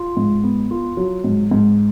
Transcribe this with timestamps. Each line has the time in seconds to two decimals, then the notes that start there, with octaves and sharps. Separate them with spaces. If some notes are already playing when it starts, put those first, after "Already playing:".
Already playing: F4
0.17 G#2
0.43 B3
0.71 F4
0.97 F#3
1.24 G#2
1.51 G#2